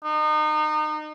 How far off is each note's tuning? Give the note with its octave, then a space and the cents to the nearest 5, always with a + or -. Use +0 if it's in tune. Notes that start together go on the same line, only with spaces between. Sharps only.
D#4 -30